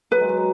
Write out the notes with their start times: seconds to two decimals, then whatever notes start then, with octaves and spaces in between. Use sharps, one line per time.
0.11 F#3 B4
0.20 G#3
0.29 F#3